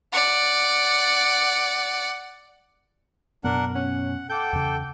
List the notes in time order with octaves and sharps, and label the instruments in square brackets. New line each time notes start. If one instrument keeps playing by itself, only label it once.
[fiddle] D5 F#5
[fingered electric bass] F#2 B2 B3 [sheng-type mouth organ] D4 A#4 F#5
[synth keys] C#4 [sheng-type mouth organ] F#5
[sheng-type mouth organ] A4 G5 [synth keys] F#5 D6 G6
[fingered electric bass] E2 C#3